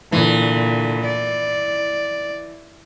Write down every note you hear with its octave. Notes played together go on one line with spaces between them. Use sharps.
A#2 D3 E3
D5